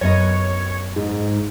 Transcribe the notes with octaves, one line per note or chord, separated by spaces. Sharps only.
F#2 B3 C#5 D#5
G#2